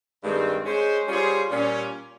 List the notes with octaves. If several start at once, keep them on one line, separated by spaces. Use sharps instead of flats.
G2 D#3 G#3 C4
G#3 C#4 G#4 C5
G3 C#4 F4 G#4 C5
A#2 G3 C#4